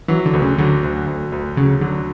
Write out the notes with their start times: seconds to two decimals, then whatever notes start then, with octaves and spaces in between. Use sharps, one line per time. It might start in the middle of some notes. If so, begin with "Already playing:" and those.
0.08 E3 F#3
0.26 D3
0.33 D2
0.42 C#3
0.58 D3 F#3
0.83 D2
1.07 D2
1.32 D2
1.57 C#3 F#3
1.81 D3 F#3